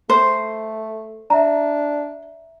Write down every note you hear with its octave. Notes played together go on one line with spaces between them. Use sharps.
A3 C5
D4 E5 A#5